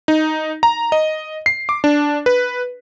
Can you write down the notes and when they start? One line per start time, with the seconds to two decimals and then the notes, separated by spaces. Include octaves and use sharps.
0.08 D#4
0.63 A#5
0.92 D#5
1.46 C7
1.69 D6
1.84 D4
2.26 B4